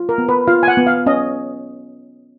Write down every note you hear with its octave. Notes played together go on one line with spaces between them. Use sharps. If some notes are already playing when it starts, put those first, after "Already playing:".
Already playing: F4
A#4
B3
B4
F4 F5
G#5
F#5
B3
F5
C#4 D#5